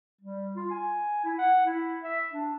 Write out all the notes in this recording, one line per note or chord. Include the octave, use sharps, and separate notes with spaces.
G3
F4
G#5
E4
F#5
E4
E5
D4